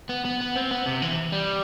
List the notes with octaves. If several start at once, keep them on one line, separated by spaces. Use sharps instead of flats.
B3
B3
B3
C4
B3
C3
E3
G3